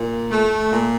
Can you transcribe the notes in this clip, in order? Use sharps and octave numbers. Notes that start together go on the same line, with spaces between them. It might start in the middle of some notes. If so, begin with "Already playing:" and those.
Already playing: A#2
A3
A#2